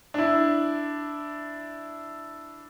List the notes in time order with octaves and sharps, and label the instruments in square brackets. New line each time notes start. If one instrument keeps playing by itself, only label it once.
[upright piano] D4 E4